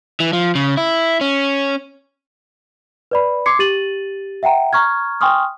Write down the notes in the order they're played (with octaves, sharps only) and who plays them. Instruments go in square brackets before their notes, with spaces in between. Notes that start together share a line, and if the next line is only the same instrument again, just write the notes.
[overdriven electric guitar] E3
F3
C#3
E4
C#4
[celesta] B4 D5 B5
C6 D6 G#6 C7 C#7
G4 A6 D#7 F#7
E5 F#5 G5 A#5
A#5 C#6 F6 G#6
G5 G#5 C6 C#6 D#6 F6